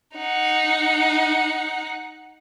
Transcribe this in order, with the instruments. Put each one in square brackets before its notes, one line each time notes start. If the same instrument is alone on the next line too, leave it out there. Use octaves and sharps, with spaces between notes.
[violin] D#4 F#5